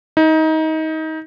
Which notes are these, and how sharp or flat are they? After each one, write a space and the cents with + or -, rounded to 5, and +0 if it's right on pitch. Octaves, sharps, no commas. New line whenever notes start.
D#4 +25